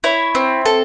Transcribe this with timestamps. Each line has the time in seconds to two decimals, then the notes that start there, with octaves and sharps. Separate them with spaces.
0.04 E4 C#5
0.35 C4
0.66 A4